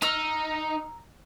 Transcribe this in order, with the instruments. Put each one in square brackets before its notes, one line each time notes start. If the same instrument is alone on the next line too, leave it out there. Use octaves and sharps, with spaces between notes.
[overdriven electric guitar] D#4 [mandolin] A#5 E6 F6